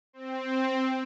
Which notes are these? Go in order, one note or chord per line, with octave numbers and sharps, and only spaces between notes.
C4